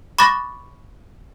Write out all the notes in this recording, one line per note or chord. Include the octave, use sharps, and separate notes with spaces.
B5 C#6 D6 F#6 A6 A#6